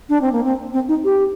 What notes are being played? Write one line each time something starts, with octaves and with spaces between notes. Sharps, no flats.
D4
C4
A#3
C4
C4
D#4
G4